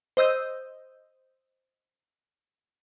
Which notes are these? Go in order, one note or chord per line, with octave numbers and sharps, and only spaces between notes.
C5 D#5 E6 G6